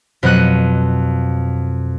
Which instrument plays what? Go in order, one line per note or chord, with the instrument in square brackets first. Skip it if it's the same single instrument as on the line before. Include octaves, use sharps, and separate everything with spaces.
[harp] F2 B2 F#3 F#5 F#6 D#7